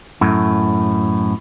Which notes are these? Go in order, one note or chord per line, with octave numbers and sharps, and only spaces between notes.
F#2 A2